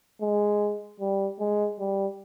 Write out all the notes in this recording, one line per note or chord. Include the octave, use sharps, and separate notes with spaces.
G#3
G3
G#3
G3